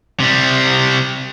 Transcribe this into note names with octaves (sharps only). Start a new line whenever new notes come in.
C3 G3